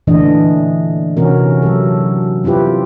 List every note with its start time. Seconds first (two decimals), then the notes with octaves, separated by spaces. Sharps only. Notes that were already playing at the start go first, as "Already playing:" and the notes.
0.07 A#2 D3 E3 A3 D4 D#5
1.17 C3 E3 C#4 F#4 A#4
1.62 F#3 A4
2.44 C4 E4 F4 G4 B4